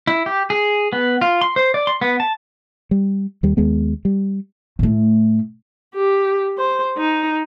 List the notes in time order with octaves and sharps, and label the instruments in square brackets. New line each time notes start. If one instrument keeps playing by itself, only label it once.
[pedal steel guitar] E4
G4
G#4
B3
F4
C6
C5
D5
C6
B3
A5
[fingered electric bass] G3
D#2 G3
D#2 G#3 B3
G3
[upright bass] A2 A3
[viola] G4
C5
D#4